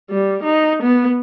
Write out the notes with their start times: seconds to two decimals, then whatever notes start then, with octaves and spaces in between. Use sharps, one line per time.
0.10 G3
0.44 D#4
0.83 B3